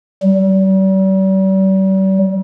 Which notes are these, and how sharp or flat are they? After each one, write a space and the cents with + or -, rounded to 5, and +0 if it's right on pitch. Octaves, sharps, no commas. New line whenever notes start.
G3 -40